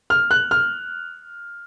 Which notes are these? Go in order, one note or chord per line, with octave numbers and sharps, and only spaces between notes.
F6
F#6
F6